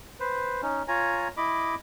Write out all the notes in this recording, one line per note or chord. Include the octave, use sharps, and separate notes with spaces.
B4 C5
C#4 D#4
F4 C#5 G#5 A#5
E4 D#5 B5 D6